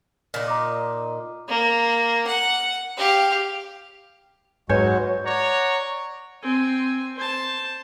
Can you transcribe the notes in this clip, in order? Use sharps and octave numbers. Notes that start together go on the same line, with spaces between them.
A#2 D#4
A#5 D6
A#3
F#5
G4 F5
G#2 F#3 G#3 F#4 B4 C#5 G#5 G6
C#5 D5 F#5 A#5
C4 G#5
C5 A5